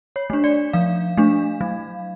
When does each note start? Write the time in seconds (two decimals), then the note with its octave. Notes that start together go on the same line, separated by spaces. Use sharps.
0.16 C#5
0.30 A3 D4
0.44 D5
0.73 F3 F5
1.17 A3 D4
1.61 F#3